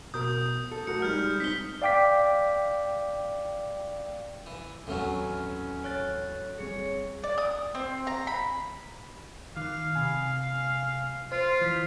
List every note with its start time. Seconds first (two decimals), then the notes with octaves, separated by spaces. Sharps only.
0.14 B2 A#4 D#6 G6
0.72 A4
0.87 A3 F#4 A#4 C#7
1.02 G3 G#3 D#4 F6 G6
1.40 C4 D#4 B6 G7
1.82 D5 F5 G5 D6 B6
4.46 E3
4.87 D#2 A2 E3 F#3 C4 C#4
5.84 C#5 F#6 A6
6.58 D1 G3 C4 G#4 C#5
7.24 D5
7.38 D#6
7.75 C4
8.07 A#5
8.27 B5
9.57 D#3 F5
9.95 C3 G#5
11.32 F4 C5
11.61 E3 B6